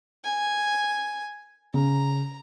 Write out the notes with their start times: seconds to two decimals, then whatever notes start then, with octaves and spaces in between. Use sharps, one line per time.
0.24 G#5
1.74 C#3 A#5